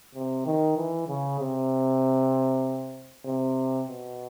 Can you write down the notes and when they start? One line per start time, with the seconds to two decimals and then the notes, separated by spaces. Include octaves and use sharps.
0.15 C3
0.46 D#3
0.77 E3
1.08 C#3
1.40 C3
3.26 C3
3.88 B2